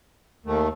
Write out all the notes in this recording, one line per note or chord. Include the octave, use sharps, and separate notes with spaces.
D#2 D#3 A3